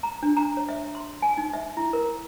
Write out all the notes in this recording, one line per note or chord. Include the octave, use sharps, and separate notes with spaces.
A#5
D4
A#5
C#5
E5
C6
G#5
D#4
E5
E4
A#4